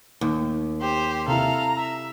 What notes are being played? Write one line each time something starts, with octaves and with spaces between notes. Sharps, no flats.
D#2
G4 C5
C3 E4 A4 F5 A#5
E5